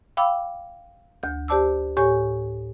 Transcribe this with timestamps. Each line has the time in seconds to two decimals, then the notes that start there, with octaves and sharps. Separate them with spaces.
0.17 F5 G5 B5 D6 E6
1.23 D2 G6
1.48 G4 C5 D5 A5 D6 E6
1.97 A2 G4 C#5 G#5 C#6